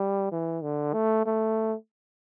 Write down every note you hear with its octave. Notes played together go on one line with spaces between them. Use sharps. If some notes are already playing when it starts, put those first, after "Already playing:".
Already playing: G3
E3
D3
A3
A3